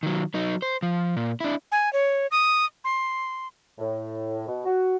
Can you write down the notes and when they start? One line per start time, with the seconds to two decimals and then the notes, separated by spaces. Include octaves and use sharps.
0.03 D#3 F#3
0.34 F#3 D#4
0.62 C5
0.83 F3
1.16 A#2
1.40 D4 E4
1.72 G#5
1.93 C#5
2.31 D#6
2.84 C6
3.79 A2
4.48 B2
4.66 F#4